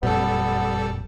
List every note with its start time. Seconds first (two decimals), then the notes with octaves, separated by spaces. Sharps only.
0.03 F#1 F2 A#2 G3 B3 C4 A4